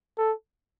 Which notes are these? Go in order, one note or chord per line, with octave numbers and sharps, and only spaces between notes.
A4